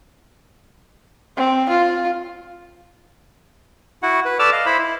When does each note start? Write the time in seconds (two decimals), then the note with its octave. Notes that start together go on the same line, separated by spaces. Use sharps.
1.37 C4
1.69 F4
4.03 E4 F#4 F#5
4.25 B4
4.39 A4 B4 D5 D6 E6 F6
4.52 D#5 F5
4.66 E4 C5 B5
4.78 E4